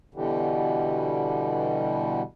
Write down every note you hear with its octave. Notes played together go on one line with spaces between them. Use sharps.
B2 D3 E3 G3